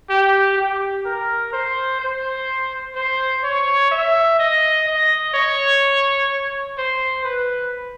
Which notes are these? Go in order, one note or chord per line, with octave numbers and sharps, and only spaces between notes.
G4
G4
A#4
C5
C5
C5
C#5
E5
D#5
D#5
C#5
C5
B4